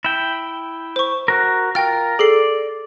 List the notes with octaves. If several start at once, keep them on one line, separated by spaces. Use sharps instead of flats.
E4 G5
C5 C#6
F#4 A#4
F4 A#4 G5 F6
G#4 A4 D5 C7